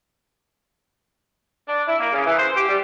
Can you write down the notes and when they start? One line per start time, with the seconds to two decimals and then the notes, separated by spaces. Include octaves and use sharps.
1.69 D4
1.88 E4
2.00 A#3
2.13 C#3
2.27 E3
2.39 C5
2.56 G4
2.69 G3